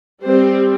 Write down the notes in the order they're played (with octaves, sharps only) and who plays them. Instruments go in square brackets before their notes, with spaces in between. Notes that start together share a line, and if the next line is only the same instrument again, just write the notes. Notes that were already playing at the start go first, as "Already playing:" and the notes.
[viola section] G3 C4 C5